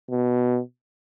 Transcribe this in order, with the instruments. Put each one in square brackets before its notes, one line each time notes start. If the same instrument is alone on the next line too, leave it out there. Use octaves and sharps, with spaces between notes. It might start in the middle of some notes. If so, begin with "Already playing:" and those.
[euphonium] B2